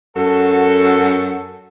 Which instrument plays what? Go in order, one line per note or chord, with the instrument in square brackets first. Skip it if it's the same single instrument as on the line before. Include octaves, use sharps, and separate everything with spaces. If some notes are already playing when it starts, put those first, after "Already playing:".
[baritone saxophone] F#2 [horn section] F#4 A4